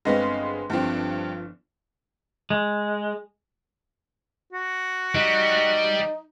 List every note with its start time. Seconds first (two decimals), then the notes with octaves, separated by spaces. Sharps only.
0.05 G1 G#3 B3 C4 F5 A#6
0.70 G1 G2 F3 C4
2.50 G#3
4.53 F#4
5.15 G3 D#4